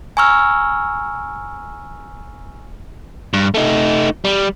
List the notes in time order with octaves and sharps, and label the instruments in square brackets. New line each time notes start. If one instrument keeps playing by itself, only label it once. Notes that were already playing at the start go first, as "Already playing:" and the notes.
[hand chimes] G#5 A#5 C#6 E6 F6
[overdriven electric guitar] G2
A3 D#4
G3